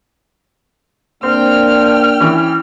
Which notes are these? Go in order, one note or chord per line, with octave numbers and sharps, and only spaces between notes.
A#3 C4 D4 G5 F6
E3 C#4